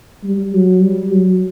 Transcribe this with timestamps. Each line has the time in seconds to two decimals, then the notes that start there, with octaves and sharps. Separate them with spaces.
0.23 G3
0.53 F#3
0.82 G3
1.12 F#3